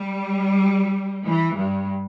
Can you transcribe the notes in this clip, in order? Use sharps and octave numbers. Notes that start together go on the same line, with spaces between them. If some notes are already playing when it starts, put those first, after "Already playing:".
Already playing: G3
E3
G2